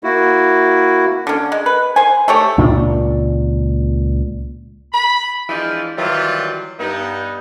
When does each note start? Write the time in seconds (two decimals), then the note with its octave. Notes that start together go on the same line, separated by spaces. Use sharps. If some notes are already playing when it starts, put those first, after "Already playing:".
0.04 A#3 E4 F#4
1.27 D3 C#4
1.52 G#3
1.66 B4
1.96 C5 G#5
2.28 A3 G4 C#5
2.58 C#2 A#2 D4
4.93 B5
5.49 E3 F3 G#3 D4 F4 D5
5.97 D#3 E3 F#3 G3 F4
6.79 G2 B3 D#4